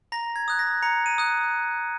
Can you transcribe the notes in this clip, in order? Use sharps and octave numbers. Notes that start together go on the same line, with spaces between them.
A#5 A#6
G#6
D#6 F#6
A#6
A#5 C#7
D#7
D#6 F#6